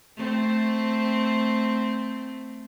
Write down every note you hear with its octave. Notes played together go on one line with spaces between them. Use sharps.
A3 C4